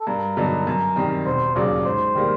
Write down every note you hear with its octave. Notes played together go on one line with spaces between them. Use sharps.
A4
G2 A#4
D3 F#3 B3 D#4
F#2
D#3 G3 C4
E1 C5
D#2 C#3 F#3 D5
G#2 C5
D#3 G3 A#3